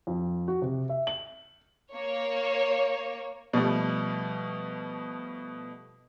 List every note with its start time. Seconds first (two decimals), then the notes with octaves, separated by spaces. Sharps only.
0.07 F2
0.48 F#4
0.62 C3
0.89 E5
1.07 F#7
1.92 A#3 C#5
3.53 B2 F3 G3 A3